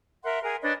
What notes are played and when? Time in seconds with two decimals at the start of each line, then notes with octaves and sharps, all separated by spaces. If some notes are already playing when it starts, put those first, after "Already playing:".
0.24 A#4 E5 F#5 C6
0.43 G#4 A#4 F#5 G#5
0.62 D4 B4 C#5 D#5